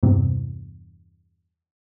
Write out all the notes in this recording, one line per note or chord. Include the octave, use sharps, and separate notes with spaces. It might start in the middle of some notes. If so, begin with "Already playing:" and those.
E2 G2 C3